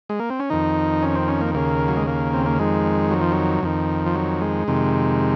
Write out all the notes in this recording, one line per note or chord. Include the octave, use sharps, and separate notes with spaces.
G#3
A#3
C4
C#4
F2 D#3 D#4
C#4
C4
C#4
A#3
D#2 C#3 A#3
F#3
G#3
A#3
C4
A#3
F2 D#3 G#3
F#3
F3
F#3
F2 D#3
F3
F#3
G#3
F2 C3 D#3